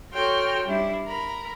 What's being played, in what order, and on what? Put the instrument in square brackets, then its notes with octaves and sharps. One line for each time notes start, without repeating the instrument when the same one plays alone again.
[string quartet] F#4 A4 C#5 G5 C6 F6
G3 D4 E4
A#4 A#5 B5